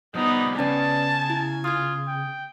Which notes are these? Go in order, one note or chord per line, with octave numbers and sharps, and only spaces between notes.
F3 G3 B3 D#4 D#6
C#3 C#4 B4 D5 G#5 A5
E4
F4 D#6 G#6
G5